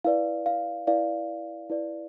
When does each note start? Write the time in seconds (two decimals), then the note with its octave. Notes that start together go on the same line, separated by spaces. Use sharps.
0.04 E4 B4 D5 F5
0.46 F5
0.87 E4 B4 D5 F5
1.69 E4 B4 D5